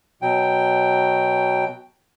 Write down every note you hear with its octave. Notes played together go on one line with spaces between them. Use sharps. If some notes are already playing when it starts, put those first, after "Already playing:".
B2 F#3 G5